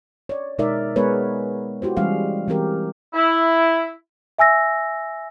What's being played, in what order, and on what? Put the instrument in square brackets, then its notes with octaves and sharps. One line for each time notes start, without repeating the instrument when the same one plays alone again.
[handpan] C#5 D5
B2 G#3 D#4 A#4 D5 E5
G#3 B3 G#4 A#4 B4 C#5
E4 F#4 G4 C5
E3 G3 G#3 C#4 G#4 F5
E3 G3 C4 G4 A#4
[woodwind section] E4
[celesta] E5 G#5 E6 A#6